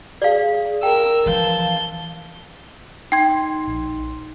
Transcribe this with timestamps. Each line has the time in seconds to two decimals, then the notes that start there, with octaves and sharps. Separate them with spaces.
0.22 G#4 D5 F5
0.83 A#4 G5 E6
1.26 E3 F3 F5 A5 G6
3.12 D#4 G5 C6 G#6
3.67 A#1